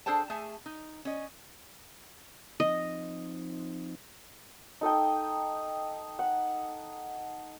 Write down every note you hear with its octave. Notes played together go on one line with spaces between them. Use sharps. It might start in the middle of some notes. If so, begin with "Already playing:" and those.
D4 G#4 A4 C5 G5 A5
A3 G#4 E5 G#5 A5
D#4
C#4 D#5
F3 C4 D#4 D#5
D#4 A4 D#5 G5
F#5